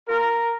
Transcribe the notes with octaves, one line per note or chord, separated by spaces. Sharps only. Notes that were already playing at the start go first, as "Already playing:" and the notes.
A#3 F4 A#4